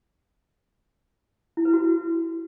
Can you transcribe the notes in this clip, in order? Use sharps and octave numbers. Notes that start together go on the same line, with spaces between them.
E4
B4
F#4